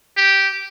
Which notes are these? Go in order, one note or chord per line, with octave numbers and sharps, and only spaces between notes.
G4